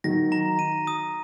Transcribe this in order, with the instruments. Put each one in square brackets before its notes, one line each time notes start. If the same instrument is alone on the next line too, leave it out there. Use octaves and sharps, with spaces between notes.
[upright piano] D#3 F#3 [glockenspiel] A#6
[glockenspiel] A#5
D#7
D#6